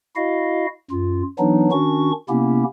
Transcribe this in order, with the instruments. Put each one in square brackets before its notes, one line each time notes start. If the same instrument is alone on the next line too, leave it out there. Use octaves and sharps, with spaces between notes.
[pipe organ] E4 F#4 D#5 F5
F#2 F4
E3 F#3 B3 D4 D#4
D#3 C#4 D4 F#4 C#6
C3 A#3 B3 C#4 E4 G4